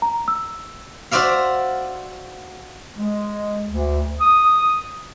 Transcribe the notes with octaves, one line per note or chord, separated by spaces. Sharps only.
A#5
E6
F#4 C5 D5 E5 F5
G#3
D2
D#6